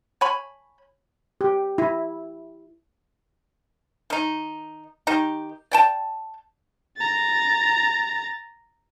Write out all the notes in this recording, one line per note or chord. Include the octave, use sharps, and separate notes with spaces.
C#5 G#5 B5
G4
E4
D#3 D#4
D#3 D#4 G4
D5 G5 A5
A#5 A6